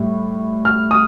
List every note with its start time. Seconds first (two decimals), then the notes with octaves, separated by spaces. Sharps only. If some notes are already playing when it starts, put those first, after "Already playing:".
Already playing: A2 G3
0.65 F6
0.91 D#6